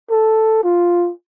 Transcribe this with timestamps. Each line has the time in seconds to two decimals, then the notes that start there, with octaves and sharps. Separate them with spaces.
0.11 A4
0.64 F4